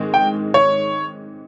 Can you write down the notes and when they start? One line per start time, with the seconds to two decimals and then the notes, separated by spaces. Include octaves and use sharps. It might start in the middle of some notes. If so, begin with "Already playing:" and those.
Already playing: G#2 D#3 G#3 C4
0.14 G5
0.54 C#5